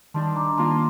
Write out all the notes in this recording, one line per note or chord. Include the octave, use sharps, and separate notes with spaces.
D#3 G3 D4 A5 C6
A#5 D6
D#3 A#3 F4 A5 C6